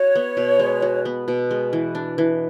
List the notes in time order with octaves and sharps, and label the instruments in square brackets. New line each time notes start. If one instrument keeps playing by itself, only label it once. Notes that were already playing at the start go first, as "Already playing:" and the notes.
Already playing: [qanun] F#4 [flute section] C#5
[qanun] B3
B2
G#3
F#4
B3
B2
G#3
E3
D4
E3